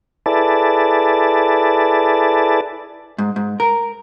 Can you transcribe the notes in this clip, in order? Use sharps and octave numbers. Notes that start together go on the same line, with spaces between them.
E4 G#4 A4 B4 D5 A5
G#2
G#2
A#4